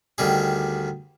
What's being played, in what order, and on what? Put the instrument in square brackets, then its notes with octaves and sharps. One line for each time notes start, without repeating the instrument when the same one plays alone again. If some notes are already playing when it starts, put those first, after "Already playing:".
[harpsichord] D2 D#3 G3 G#4